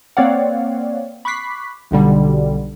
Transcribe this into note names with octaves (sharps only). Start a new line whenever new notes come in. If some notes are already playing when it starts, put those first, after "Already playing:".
A#3 C4 C#5 D5 F5 F#5
B5 C#6 D6 F#6 B6 C7
B1 B2 D3 G3